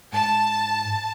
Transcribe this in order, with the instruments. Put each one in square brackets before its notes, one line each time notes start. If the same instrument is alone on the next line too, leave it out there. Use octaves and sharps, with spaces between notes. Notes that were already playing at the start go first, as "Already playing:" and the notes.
[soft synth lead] G#2 [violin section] A5